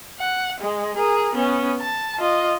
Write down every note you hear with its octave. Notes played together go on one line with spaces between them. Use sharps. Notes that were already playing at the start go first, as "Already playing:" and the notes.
F#5
G#3
G#4 A#4
B3 C#4
A5
F4 D#5